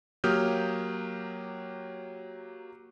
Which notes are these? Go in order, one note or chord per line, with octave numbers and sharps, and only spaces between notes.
F#3 A#3 G4 D#6 F6 G6